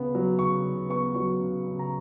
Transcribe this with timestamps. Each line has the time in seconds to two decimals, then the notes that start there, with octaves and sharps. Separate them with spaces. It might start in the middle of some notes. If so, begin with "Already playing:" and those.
Already playing: C#3 B3
0.15 F#3
0.39 C#3 C#6
0.64 C#3
0.89 B3 C#6
1.15 F#3 C#6
1.40 C#3
1.66 C#3
1.79 A#5